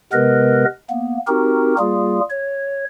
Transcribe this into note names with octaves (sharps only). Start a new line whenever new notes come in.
C3 G#3 B3 A#4 B4 D#5
A#3 B3
C4 D#4 F#4 G4 A#4
G3 A#3 F4 G#4
C#5